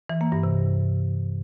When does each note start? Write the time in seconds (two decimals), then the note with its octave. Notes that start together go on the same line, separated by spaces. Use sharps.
0.10 E3
0.21 A#3
0.32 G2
0.43 C3